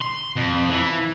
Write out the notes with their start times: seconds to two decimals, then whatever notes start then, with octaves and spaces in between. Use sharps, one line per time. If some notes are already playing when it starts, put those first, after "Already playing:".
0.02 C6
0.37 F2
0.70 E3